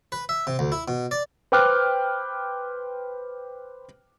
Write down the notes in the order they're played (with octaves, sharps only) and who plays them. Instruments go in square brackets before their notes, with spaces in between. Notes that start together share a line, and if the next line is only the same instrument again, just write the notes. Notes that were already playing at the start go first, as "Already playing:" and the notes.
[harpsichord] B4
E5
C3
D2
E4
B2
D5
[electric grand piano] B4 C5 G5 D6 F6 F#6